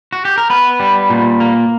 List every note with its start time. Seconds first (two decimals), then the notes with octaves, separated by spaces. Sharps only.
0.13 F#4
0.25 G4
0.38 A#4
0.50 B3 B4
0.80 G3
1.10 A#2
1.40 A#3